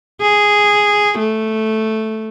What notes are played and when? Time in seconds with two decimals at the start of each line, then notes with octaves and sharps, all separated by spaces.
0.21 G#4
1.19 A3